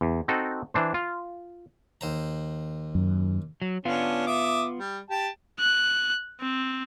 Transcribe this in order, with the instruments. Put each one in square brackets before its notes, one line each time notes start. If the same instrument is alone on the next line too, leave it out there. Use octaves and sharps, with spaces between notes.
[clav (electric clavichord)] E2
C4 D#4 F#4 A4
E3 D4 C5
F4
[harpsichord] D#2 C5 A#5
[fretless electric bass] F#2
[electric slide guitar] F#3
[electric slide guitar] B3 F4 [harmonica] C#4 D4
[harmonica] E5 D6 D#6
G3
G4 G5 A5
[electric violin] F#6
C4